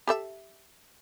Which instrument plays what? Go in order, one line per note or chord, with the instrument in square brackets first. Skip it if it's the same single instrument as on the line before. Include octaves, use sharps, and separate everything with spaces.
[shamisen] G4 A4 E5